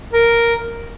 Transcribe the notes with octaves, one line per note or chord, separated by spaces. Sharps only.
A#4